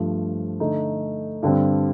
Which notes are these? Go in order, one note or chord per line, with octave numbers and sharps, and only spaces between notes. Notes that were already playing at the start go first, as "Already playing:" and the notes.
Already playing: G2 F3 A3
D3 A3 D#4
G2 D3 G3 C4